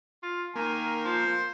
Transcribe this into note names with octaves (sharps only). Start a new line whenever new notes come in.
F4
D#3 A#3 G#5
F3 C5